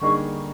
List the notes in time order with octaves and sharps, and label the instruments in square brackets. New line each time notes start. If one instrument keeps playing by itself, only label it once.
[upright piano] D3 G3 A#3 D#4 G#4 [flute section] C#6